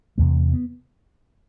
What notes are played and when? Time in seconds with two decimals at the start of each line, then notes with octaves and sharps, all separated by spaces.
0.18 E2 C3 A3
0.53 B3